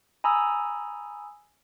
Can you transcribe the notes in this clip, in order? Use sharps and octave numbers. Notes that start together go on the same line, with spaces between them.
G#5 A#5 B5 D#6 E6